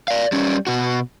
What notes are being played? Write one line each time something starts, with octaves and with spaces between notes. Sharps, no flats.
D5 F5
G3 C#4
B2 F#4